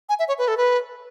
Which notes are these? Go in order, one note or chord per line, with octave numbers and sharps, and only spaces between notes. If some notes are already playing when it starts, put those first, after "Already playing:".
G#5
E5
C#5
B4
A4
B4